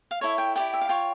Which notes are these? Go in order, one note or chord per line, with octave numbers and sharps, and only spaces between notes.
F5
E4 A4 C#5 E5
G5
E4 G4 D5 G5
E5
F5
F4 C#5 G5